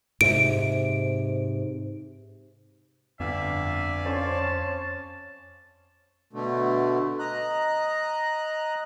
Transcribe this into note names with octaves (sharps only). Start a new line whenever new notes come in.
G#2 C3 D7
G1 F2 D5 E5 F5 G#5
C#4 C5 C#5 A5
B2 D3 A3
D#5 A#5 F#6